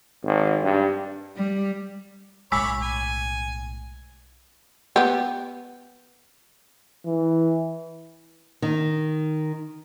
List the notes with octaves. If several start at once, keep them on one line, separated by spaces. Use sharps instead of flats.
G#1
G2
G3
B1 A2 G#3 C#5 B5 D6 E6
G#5
B3 G4
E3
D#3